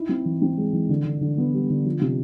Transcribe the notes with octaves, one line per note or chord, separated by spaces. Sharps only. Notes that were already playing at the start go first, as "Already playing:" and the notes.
Already playing: D#4 E4
C4
E3
C4
G#3
E3
D3
D3
D3
B3
G3
D3
F3
C3